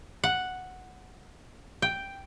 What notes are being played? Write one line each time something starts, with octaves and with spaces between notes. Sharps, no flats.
F#5
G5